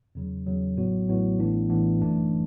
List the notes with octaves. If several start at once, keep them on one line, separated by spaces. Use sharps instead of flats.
E2 C#3 F#3
E2 C#3 F#3
A1 A2 F#3 B3 F#4
A1 A2 F#3 B3 F#4
A1 A2 E3 B3 D4
A1 A2 E3 B3 D4
G1 F#2 E3 A3 D4